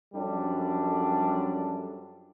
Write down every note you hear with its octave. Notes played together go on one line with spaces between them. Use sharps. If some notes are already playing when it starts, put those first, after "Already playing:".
F#2 F3 G3 D4 A4